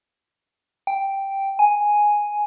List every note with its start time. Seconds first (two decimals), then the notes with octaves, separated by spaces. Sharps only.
0.87 G5
1.59 G#5